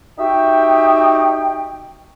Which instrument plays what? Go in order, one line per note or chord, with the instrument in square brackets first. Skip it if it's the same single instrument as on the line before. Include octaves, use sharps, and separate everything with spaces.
[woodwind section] D#4 F#4 G4 E5 G5